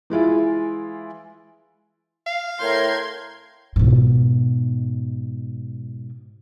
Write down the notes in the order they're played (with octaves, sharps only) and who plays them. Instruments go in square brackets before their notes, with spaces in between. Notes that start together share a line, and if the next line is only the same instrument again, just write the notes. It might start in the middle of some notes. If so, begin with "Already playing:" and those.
[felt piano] E3 G#3 E4 F4
[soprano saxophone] F5
[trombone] A2 [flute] A#4 [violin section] C6 G6 G#6
[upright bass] G#2 B2